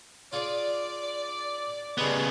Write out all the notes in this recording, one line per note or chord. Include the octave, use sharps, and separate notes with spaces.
F4 G#4 D5
C#3 G3 G#3 B3 G#4